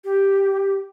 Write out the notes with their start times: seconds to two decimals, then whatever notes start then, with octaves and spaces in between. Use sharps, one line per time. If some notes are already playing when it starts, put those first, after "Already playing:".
0.04 G4